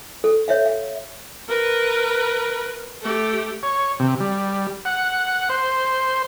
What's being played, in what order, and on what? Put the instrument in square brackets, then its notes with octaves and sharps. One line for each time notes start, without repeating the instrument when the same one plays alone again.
[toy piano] A4
C#5 E5 F5
F5
[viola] A#4 B4
A3 G4
[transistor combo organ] C#5
C3
G3
F#5
C5